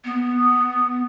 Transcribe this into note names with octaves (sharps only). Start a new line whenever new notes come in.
B3